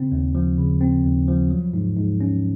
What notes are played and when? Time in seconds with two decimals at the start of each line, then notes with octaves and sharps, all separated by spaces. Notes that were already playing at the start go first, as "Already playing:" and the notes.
Already playing: C#3 C4
0.12 D#2
0.35 F3
0.58 C#3
0.81 C4
1.04 D#2
1.28 F3
1.50 F#3
1.74 G#2
1.97 G#2
2.21 C#4